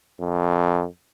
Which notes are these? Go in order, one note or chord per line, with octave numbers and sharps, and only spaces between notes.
F2